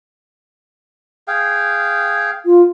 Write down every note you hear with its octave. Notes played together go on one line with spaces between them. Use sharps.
G#4 F5 G5
F4